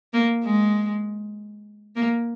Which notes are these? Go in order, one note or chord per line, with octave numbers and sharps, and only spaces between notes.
A#3
G#3
A#3